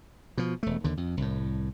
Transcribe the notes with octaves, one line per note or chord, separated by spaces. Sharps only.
B2 F3
E1 A3
D#2 D3
F2
C2 A2